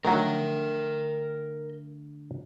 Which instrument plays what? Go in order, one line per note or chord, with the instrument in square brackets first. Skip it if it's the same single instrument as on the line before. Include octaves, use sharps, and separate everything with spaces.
[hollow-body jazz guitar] D3 A3 [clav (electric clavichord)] D#3 F#3 [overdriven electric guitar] A#4 G5